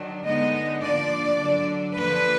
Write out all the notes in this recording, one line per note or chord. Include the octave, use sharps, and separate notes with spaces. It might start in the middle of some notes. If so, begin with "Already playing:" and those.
Already playing: D#3 F#3 D4
D3 G#3 B3 D#4 D#5
F3 A#3 D4 D5
D3 F#3 D4
D3 F3 A#3 D4 B4